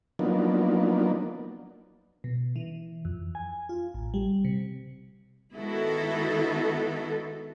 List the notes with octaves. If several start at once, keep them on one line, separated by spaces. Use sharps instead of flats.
F3 F#3 A#3 B3 D4 D#4
B2
E3
F2
G#5
F4
A1
G3
C3
D#3 G#3 B3 E4 F#4 A4